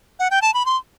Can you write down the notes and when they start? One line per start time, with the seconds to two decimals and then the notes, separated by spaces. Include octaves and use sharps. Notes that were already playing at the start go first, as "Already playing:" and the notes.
0.19 F#5
0.30 G5
0.42 A5
0.54 B5
0.66 C6